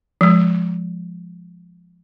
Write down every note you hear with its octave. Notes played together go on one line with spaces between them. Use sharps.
F3 G#3